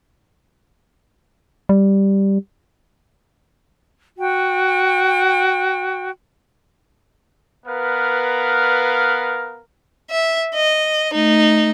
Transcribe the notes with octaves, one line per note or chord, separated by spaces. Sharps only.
G3
F#4 G5
B3 A#4 B4 F5
E5
D#5
A3 D#4